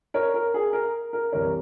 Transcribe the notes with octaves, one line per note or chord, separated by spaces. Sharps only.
A#4 C#5
A#4
G#4
A#4
A#4
C2 C3 E3 G3 A#4 C#5